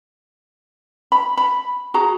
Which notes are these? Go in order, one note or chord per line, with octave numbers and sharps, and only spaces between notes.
B5
B5
F#4 G#4 A#5